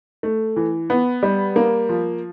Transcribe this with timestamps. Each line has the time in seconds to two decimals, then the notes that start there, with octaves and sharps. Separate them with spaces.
0.23 A3
0.56 E3
0.90 B3
1.23 G3
1.56 A#3
1.89 F3